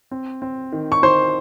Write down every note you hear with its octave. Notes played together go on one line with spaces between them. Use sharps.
C4
C4
D#3
C#6
D#3 C5 C6